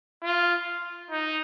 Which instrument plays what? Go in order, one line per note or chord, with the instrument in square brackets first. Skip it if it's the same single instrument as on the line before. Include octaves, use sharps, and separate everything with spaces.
[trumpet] F4
D#4